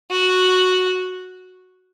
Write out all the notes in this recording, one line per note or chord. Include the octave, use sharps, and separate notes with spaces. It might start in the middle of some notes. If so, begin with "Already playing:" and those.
F#4